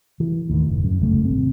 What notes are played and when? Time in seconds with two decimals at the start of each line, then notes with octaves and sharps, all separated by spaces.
0.20 E3
0.50 D#2 A2 D#3
0.67 F#1
0.84 F#2
1.00 G1 C#2 F#2 A3
1.25 G#1 C3 C4